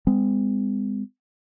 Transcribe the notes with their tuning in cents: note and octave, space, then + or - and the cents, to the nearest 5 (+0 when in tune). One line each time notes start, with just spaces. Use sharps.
G#3 -30 C4 -45